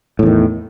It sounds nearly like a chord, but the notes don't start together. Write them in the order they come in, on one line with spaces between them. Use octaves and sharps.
A2 E2 D#3